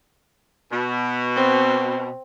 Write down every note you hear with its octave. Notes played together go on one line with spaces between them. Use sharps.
B2
C4